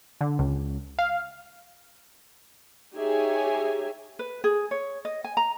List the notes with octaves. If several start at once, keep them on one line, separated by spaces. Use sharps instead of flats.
D3
C#2
F5
D#4 G4 G#4 C#5 E5 G#5
B4
G#4
C#5
D#5
G#5
A#5